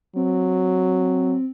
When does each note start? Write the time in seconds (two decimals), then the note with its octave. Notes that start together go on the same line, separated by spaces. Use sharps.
0.16 F#3 C4